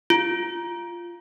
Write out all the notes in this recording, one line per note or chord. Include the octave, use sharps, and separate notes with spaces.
F4